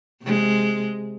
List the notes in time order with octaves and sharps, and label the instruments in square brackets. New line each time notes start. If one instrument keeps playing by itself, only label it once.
[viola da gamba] C3 G#3